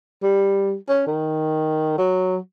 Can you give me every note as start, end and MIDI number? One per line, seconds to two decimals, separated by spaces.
0.23 0.74 55
0.89 1.04 61
1.07 1.94 51
1.98 2.36 54